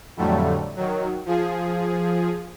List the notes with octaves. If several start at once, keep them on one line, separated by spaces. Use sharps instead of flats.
F2 A2 D3 F#3 G3 A3
D#3 F#3
F3 G#4